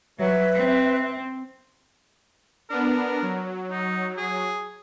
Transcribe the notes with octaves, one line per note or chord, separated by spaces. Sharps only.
F#3 B4 E5
C4
B3 D4 A#4
F#3
D#4
G#4